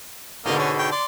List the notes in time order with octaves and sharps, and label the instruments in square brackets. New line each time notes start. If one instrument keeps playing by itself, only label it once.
[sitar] G#2 B2 D3 [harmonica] A#3 A#4 D#5
[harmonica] C#4
C#5 G5
D5 C6